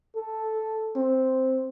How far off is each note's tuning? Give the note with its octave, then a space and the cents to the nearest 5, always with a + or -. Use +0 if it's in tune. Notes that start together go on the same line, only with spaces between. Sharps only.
A4 -5
C4 +0